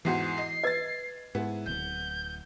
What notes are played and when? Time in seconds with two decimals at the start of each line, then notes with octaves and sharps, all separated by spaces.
0.05 E2 G#2 E3 F#4 C7
0.38 D#5
0.64 B4 D#5 G#6 A6
1.35 G#2 B3 E4
1.66 D1 G6